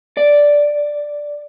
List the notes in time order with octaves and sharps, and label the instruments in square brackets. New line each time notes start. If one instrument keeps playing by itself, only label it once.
[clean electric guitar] D5